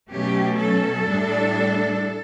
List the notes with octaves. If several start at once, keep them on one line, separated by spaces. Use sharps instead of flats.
B2 F#3 A3 C#4 G4
A4
A2 G3 D4